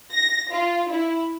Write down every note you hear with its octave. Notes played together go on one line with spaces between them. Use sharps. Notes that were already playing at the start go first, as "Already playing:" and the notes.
A#6
F4
E4